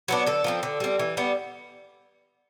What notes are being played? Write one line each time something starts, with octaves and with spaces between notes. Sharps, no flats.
F#3 B3 D4
D3 A4
F3 A3 C4
D3
G3 C4
E3
G3 B3